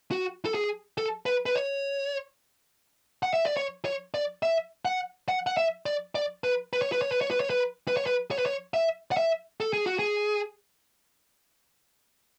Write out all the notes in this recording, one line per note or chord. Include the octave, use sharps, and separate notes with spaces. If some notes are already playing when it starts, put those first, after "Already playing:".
F#4
A4
G#4
A4
B4
B4
C#5
F#5
E5
D5
C#5
C#5
D5
E5
F#5
F#5
F#5
E5
D5
D5
B4
B4
C#5
B4
C#5
B4
C#5
B4
C#5
B4
B4
C#5
B4
C#5
B4
C#5
E5
F#5
E5
A4
G#4
F#4
G#4